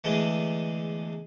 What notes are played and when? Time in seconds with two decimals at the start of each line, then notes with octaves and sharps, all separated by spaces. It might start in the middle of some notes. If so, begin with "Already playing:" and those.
0.04 E2 D3 G#3 A3